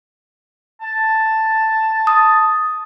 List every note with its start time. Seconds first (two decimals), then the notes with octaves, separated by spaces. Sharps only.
0.82 A5
2.07 D#6